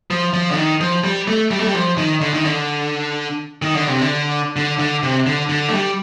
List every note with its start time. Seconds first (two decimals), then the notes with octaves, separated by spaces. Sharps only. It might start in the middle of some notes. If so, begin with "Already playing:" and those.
0.11 F3
0.33 F3
0.51 D3
0.57 D#3
0.81 F3
1.04 G3
1.27 A3
1.51 G3
1.60 A3
1.67 G3
1.74 F3
1.98 D#3
2.21 D3
2.33 D#3
2.45 D3
3.62 D#3
3.75 D3
3.87 C3
4.01 D3
4.56 D3
4.79 D3
5.03 C3
5.26 D3
5.49 D3
5.69 A3
5.73 G3